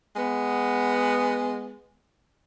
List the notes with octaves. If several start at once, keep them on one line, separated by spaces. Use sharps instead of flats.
G#3 B3